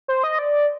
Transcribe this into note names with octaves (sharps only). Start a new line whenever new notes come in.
C5
D#5
D5